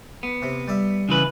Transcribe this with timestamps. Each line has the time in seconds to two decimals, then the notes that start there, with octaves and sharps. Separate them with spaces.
0.23 B3
0.42 C3
0.68 G3 E5
1.09 C#3 E3 B4